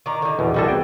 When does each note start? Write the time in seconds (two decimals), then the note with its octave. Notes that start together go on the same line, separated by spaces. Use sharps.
0.06 D#3 D5 A#5
0.22 D3 D#4
0.39 E2 B2
0.54 C2 G3 B3 F#4 G#4 A4
0.68 G5